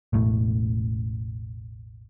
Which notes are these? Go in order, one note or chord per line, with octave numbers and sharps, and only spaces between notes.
E1 A1 A2